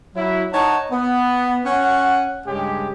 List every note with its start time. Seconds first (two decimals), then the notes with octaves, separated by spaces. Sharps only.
0.16 F#3 E4
0.52 D#4 C#5 D#5 F#5 A5
0.91 B3
1.65 C#4 F#5
2.45 G2 C#3 G#3 G4